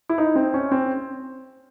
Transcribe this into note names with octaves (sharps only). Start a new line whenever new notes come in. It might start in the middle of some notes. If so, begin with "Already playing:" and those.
E4
D#4
C4
C#4
C4